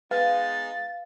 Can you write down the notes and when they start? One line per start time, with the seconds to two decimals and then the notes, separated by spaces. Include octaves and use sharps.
0.11 G#3 B3 D#4 B4 F5 A6